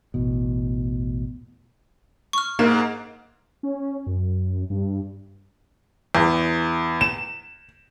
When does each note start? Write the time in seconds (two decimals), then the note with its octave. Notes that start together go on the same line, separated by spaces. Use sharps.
0.14 A1 E2 B2
2.33 C#6 F6
2.59 G#2 A#3
3.63 C#4
4.07 F#2
4.70 G2
6.15 E2
7.01 E7